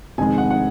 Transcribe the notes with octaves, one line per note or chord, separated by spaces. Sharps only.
F1 F2 D#3 G#3 G#5
F#5
F#5